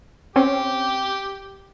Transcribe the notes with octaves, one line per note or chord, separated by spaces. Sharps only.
C4 C#4 G4